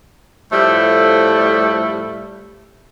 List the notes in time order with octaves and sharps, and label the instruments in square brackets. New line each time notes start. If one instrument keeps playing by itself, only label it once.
[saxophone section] A2 F3 G3 A3 A4